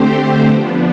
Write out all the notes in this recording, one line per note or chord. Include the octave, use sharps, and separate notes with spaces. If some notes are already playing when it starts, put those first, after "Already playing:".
Already playing: D3 A3 C4 G4 C5
F3 B3 D4